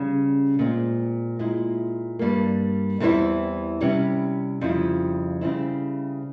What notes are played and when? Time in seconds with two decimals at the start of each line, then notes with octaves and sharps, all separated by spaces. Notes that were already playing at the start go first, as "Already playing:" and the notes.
Already playing: C#3 G3 C#4
0.59 A#2 G#3 C4
1.39 A#2 G#3 E4
2.19 G2 G3 A#3
3.00 E2 E3 G3 C4 E4
3.80 C3 G3 C#4 E4
4.61 F2 C#3 G3 C4 E4
5.41 C#3 G3 C4 E4